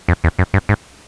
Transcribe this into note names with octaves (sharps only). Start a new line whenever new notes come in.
F2
E2
F#2
G2
G#2